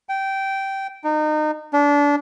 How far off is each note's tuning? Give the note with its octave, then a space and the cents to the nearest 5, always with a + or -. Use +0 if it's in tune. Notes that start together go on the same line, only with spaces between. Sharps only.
G5 -15
D#4 -30
D4 -25